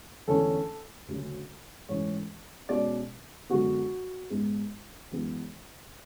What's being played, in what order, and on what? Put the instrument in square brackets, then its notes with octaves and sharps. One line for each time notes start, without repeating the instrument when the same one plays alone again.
[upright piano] E2 D3 A3 C#4 A4
D2 C#3 F#3 C#4
G#2 E3 A3 C#4 C#5
B2 G#3 C#4 D5
F#2 D3 G#3 B3 F#4
G#2 G#3 B3
F#2 E3 G#3 B3